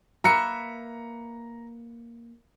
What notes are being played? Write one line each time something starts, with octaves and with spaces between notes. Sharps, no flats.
A#3 B4 E5 A#5 C#7